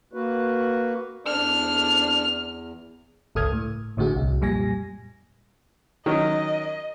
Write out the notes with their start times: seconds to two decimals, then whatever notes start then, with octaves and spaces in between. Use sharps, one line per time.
0.13 A#3 F#4 B4
1.27 E2 D4 F6
3.35 G1 C#2 A4 D#6 F6 G#6
3.52 A2
3.97 A1 A2 D3 F#4 G#4
4.16 C2
4.41 F2 A#2 G3 G#5 A#6
6.06 D#3 F#3 C#4 D#5